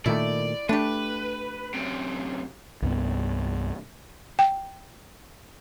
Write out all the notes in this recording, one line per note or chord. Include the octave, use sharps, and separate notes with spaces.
A#2 D#3 A3 E4 D5
A3 D4 G4 B4
F#2 C3
C2 G2 B3
G5